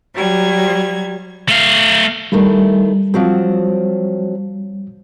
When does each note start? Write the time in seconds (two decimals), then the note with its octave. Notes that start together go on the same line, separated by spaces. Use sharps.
0.14 F#3 G3 G#6
1.49 A3 F5
2.32 D#3 G3 A3 E4
3.14 F3 F#3 C4